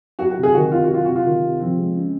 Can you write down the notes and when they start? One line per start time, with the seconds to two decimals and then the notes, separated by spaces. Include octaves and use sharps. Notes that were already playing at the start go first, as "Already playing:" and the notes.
0.19 F#3 F#4
0.31 F#4
0.37 C3
0.43 G#4
0.54 D#3 F#4
0.72 C3 F4
0.84 F#4
0.90 F#3 F4
1.05 C3 F#4
1.16 F4
1.25 D#3
1.42 C3
1.60 F3 C4
1.78 G#3
1.95 C#3